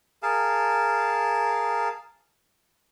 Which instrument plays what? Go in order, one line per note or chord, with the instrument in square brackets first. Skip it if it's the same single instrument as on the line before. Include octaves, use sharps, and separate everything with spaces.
[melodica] G#4 A#4 F5 A5